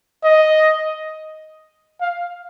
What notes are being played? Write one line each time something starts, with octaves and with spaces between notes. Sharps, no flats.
D#5
F5